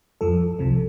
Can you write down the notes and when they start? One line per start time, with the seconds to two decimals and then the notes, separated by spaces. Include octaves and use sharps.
0.21 F2 F3 A4
0.59 C2 C3 F3